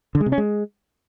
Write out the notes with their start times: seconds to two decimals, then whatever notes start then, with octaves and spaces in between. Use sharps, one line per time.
0.15 D3
0.21 G#3
0.26 C3
0.32 C#4
0.38 G#3